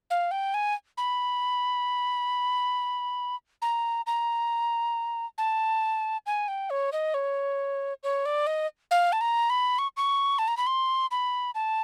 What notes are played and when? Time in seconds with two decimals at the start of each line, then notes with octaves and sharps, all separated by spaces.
0.10 F5
0.31 G5
0.54 G#5
0.97 B5
3.62 A#5
4.07 A#5
5.38 A5
6.26 G#5
6.48 G5
6.70 C#5
6.92 D#5
7.14 C#5
8.03 C#5
8.25 D5
8.47 D#5
8.91 F5
9.12 A5
9.21 A#5
9.50 B5
9.78 C#6
9.97 C#6
10.38 A5
10.48 A#5
10.57 B5
10.67 C6
11.11 B5
11.55 A5